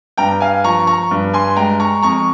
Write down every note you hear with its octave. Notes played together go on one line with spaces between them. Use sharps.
G2 G5 A#5
F5 G#5
F3 A#5 C#6
A#5 C#6
G2
G#5 C6
G#3 G5 A#5
A#5 C#6
F2 A#5 C#6